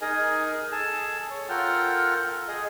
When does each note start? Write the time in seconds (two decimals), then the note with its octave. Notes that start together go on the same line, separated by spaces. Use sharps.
0.01 D#4 G#4 A#4 D#5 G#5
0.72 G#4 A4 G#5 A5
1.30 C#5
1.49 F4 A4 A#4 F#5 G5 F6
2.48 G#4 D#5